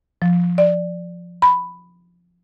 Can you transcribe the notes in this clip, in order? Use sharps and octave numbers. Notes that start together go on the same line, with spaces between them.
F3
D5
B5